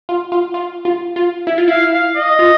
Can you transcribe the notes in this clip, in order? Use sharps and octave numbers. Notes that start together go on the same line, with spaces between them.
F4
F4
F4
F4
F4
E4
F4
E4 F5
F5
D#5
F4